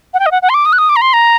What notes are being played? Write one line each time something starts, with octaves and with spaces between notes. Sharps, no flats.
F#5
G5
D#5
F#5
F#5
C6
D6
D#6
F#6
D#6
D6
A#5
C6
A#5